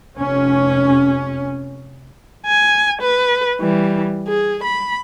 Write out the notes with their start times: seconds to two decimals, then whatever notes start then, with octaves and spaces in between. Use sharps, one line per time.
0.18 F1 C#4
2.46 G#5
3.02 B4
3.60 E3 G3
4.28 G#4
4.64 B5